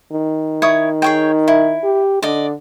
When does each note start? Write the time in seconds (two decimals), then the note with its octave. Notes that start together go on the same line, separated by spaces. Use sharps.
0.12 D#3
0.62 E4 C#5 D#6
1.02 G#4 C#5 G5
1.48 E4
1.84 G4
2.23 D3 D5 D#5